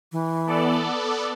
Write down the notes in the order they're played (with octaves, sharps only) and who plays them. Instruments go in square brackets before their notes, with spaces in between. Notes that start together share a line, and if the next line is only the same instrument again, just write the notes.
[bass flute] E3
[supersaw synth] B3 A4 D5